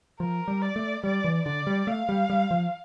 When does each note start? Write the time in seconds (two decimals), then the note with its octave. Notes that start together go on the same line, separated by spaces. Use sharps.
0.20 F3 A#4
0.48 G3
0.62 D5
0.76 A3
1.04 G3 D5
1.24 E3
1.46 D3 D5
1.67 G3
1.87 A3 F5
2.09 G3
2.30 G3
2.51 F3